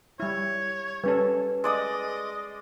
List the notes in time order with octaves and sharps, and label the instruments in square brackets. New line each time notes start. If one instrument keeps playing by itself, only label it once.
[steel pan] G3 E4 [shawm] C#5
[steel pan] G3 C#4 A4 [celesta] B4
[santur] G#3 D5 D#6 [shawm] D#5